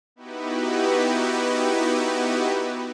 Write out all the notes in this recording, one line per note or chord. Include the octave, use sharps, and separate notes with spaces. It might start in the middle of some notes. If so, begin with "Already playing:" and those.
B3 D#4 E4 F#4 G4 B4